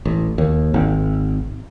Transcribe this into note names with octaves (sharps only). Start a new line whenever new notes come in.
A1
D#2
G#1